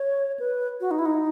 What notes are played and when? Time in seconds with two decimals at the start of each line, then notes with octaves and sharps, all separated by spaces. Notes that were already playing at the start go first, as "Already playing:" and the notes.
Already playing: C#5
0.40 B4
0.81 F#4
0.91 D#4
0.99 E4
1.06 D#4